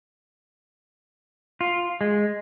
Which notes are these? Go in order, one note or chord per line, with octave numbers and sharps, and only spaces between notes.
F4
G#3